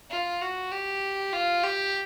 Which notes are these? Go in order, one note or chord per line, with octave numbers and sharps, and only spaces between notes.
F4
F#4
G4
F4
G4